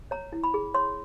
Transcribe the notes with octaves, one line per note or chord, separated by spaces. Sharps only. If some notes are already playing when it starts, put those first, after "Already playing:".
C#5 A#5
E4
B5
G#4
C#5 C6